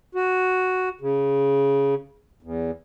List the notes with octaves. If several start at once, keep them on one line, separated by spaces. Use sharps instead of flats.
F#4
C#3
E2